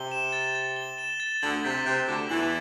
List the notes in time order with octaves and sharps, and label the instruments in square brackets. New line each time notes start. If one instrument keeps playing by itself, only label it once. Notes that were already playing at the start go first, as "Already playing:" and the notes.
Already playing: [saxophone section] C3 [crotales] G7
[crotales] E7
A6
A6
G7
E7
A6
[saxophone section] D2 D3 [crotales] F#7
[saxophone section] C3 [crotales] B6
[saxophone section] C3 [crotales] F#6
[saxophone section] D2 D3 [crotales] D6
[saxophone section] E2 E3 [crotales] F#7